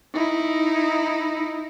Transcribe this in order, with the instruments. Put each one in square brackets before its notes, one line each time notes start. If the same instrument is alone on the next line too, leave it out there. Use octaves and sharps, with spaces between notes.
[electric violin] D#4 E4